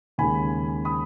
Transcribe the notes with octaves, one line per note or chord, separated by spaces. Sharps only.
D#2 C#3 G#3 G#5 B5
B5 D#6